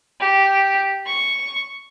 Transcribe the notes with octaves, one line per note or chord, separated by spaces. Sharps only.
G4
C#6